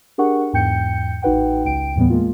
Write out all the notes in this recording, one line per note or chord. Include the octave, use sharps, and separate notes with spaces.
D4 G4 G#4 A#4 F#5 C#6
E2 G#2 G5 G6 C#7
A1 D#4 F#4 B4 F#5 G5
C#2 G5 D7
D#2 A2 E3 G3 B3
G#3 A#3 F4